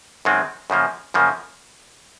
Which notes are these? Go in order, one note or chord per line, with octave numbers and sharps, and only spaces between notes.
F#2 D#3 G#3 C4
F#2 C#3 F3 A#3
F#2 C#3 F3 A#3